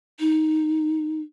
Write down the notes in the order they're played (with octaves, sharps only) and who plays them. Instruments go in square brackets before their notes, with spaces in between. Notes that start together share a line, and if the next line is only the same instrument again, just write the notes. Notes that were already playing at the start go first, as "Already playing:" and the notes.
[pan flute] D#4